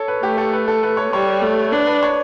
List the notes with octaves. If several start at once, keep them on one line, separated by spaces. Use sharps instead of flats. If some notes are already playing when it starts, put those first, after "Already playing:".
Already playing: A4 C#5
B4
A3 G4
A4
B4
A4
B4
C#5
G3 C#5
A3
D4 B4
B4
C#5